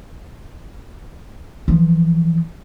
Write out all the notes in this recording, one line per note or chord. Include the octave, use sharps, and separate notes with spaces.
E3 F3